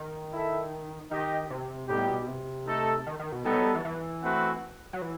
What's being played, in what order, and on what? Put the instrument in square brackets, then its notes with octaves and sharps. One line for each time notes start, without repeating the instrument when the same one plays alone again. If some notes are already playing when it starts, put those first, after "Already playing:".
Already playing: [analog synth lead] D#3
[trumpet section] E4 A4 E5
[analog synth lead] D#3 [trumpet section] D#4 G4 D#5 G5
[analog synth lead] C3
[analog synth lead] A2 [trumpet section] G3 B3 D#4 G4
[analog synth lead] B2
C3
[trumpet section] A3 D#4 A4
[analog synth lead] D#3
D#3
B2
[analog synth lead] G3 [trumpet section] B3 D#4 A4
[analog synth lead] F#3
G3
E3
E3
[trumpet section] A3 C4 F#4 B4 F#5
[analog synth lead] F#3
E3